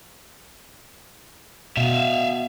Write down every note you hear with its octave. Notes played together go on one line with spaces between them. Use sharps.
B2 E5 F5